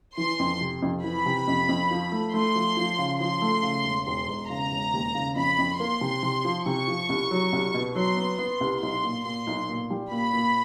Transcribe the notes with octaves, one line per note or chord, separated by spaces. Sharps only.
E3 C6
F2
C3
F2
E3 B5
C3
F2
F2
F3
A3
A3 C6
F3
F3
C#3
F3 C6
A3
C#3
E1
E1 C6
E1
C#3 A#5
E1
D#2
C#3
F2 B5
F2
A#3 C6
C3
C3
F3
C3 C#6
F3
C2
F#3
C2
B2
F#3 C6
B3
B3 C6
C2
B1 C6
A#2
A#2 C6
B1
A#2
G3
A#2 B5
A#2